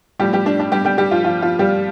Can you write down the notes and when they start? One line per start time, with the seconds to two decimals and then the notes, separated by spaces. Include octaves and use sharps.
0.20 A2 F3 G3 G4
0.33 G3 G4
0.46 D4
0.60 D4
0.72 G3 G4
0.85 G3 G4
0.98 G3 G4
1.11 F3 F4
1.24 F3 F4
1.42 F3 F4
1.59 G3 G4